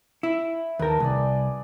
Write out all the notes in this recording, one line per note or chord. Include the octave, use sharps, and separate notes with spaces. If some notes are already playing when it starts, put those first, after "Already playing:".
E4
D#2 A#4 B4 G5 A5
C2 G#4 D5